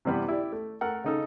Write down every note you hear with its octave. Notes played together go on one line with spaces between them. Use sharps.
C3 E3 G3 B3
E4 G4 D5
A3
A3 A4 A#4 F#5
C#3 D#4 A4